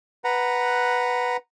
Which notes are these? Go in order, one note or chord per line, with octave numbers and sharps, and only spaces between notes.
B4 F#5 A#5